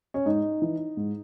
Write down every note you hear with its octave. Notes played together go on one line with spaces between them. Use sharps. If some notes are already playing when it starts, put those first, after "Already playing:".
C#4
G#2 D#4
E3
G#2